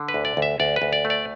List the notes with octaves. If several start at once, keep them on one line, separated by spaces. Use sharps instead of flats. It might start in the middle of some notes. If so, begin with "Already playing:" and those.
Already playing: D3
B4
D2
D5
D2
E5
D2 D5
B4
D2
D5
A3
D5